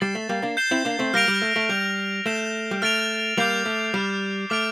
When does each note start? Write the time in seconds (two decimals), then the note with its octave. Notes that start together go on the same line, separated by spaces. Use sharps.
0.01 G3 A6 C7 E7 G7
0.15 A3
0.29 G3 A#3
0.42 A#3 D4
0.57 G6 C7 E7 G7
0.71 C4 E4
0.85 A#3 D4
0.99 A3 C4
1.14 G3 A#3 F6 A#6 D7 F7
1.28 G3
1.42 A3
1.56 A3
1.69 G3 G6 D7 F7
2.26 A3 G6 C7 E7 G7
2.71 G3
2.82 A3 F6 A6 D7 F7
3.37 G3 A#3 D6 G6 C7 F7
3.65 A3
3.94 G3 F6 C7 E7
4.50 A3 D6 F6 A6 D7 F7